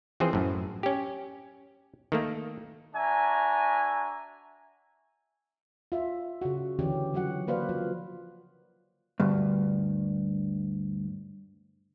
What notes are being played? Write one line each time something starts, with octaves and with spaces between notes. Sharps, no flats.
E3 F3 C4 G#4 C5
F#2 A2
C#4 G4
D#3 A3 A#3
D4 F#4 E5 G#5 A#5
F4 E5
C#3 F#4
D3 E3 C#4 G4
F3 F#3 F#4 F#5
A#3 F#4 B4 C5 D5 F5
F3
D2 G2